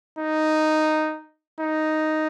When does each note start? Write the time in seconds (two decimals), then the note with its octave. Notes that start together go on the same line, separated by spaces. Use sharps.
0.19 D#4
1.60 D#4